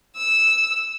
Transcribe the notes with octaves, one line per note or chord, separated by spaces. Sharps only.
E6